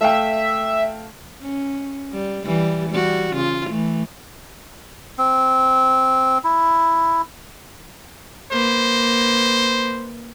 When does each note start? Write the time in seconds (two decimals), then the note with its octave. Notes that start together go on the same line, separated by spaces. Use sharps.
0.01 A3 E5 F5 G5
1.42 C#4
2.12 G3
2.45 E3 G3
2.90 G3 F#4
3.34 C#3 F4
3.70 E3 A3
5.18 C4
6.44 E4
8.52 A#3 B4 C5